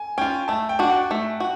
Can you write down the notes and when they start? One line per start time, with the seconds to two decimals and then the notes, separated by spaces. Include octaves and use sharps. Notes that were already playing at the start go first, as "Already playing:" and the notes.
Already playing: G#5
0.18 C#4 F4 G5
0.48 A3 A5
0.69 G5
0.79 D4 F#4
0.90 F#5
1.11 A3
1.40 F#4